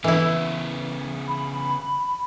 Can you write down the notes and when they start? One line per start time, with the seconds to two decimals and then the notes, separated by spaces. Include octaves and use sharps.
0.04 C#3 E3 B3 E4
1.28 B5